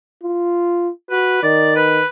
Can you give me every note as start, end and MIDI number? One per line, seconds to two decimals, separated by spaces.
0.23 0.90 65
1.10 1.42 66
1.10 1.42 71
1.43 2.01 51
1.43 1.74 74
1.76 2.06 71